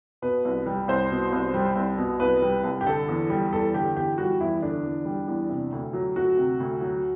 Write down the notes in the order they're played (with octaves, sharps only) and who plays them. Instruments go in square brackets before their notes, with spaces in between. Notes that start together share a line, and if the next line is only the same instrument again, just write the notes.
[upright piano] B2 B4
C2
G3
C2 C5
B2
C2
G3
C2
B2
C2 B4
G3
C2
G4
D3 A4
E2
G3
E2 A4
D3 G4
E2 G4
G3 F#4
E2 E4
D3 D4
E2
G3
E2
C3
D2
F#3
D2 F#4
C3
D2
F#3